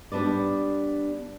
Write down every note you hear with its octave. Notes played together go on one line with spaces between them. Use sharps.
G3 B3 D4 B4 D5